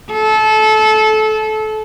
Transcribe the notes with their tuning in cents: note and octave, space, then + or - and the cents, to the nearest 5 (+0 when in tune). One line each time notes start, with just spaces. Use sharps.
A4 -25